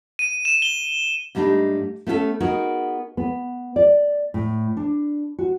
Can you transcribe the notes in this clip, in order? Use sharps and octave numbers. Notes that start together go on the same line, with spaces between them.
D#7
E7
G7
G#2 G3 A3 A#3 D4 D#4
A3 B3 C#4 E4 A4
B3 D#4 F#4 G#4 A#4
B3
D5
A2
D4
F#4